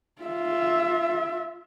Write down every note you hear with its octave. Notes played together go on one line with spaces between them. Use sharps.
F4 E5